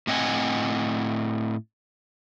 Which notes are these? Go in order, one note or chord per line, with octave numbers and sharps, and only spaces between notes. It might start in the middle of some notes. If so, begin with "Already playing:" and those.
A2 C4 D#5 F#5 G#5